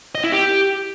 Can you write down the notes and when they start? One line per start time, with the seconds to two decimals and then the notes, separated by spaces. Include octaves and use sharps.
0.15 D#5
0.24 E4
0.32 G4